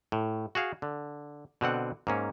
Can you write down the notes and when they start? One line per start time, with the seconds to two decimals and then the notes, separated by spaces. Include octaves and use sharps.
0.12 A2
0.55 F#4 G#4 F5
0.82 D3
1.61 B2 D3 C4 F#5
2.07 G#2 A#3 C#4